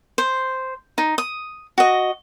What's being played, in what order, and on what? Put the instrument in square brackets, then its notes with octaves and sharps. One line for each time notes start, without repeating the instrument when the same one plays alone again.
[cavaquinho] C5
D#4
D#6
F#4 D#5